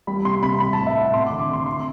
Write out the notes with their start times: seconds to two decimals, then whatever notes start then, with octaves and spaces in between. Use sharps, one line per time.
0.07 G3 B5
0.24 C3 C6
0.43 C3 B5
0.60 G3 B5
0.73 A2 A5
0.86 E5
0.96 A2 F#5
1.14 C4 C6
1.26 D6
1.31 D3
1.39 D6
1.48 D3 C6
1.66 C4 C6